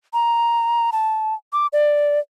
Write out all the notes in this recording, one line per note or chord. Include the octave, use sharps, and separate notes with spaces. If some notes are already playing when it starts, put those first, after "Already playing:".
A#5
A5
D6
D5